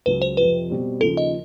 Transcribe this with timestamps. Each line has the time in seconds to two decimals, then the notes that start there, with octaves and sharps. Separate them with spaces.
0.06 C#2 C#3 F#3 B4
0.22 C5
0.37 F2 C3 F3 B4
0.69 B2 G3 C4
1.01 D#2 C#3 F3 A4
1.17 D#5